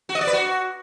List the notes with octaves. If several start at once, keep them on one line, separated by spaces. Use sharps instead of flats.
F#4
D#5
D5
B4
F#4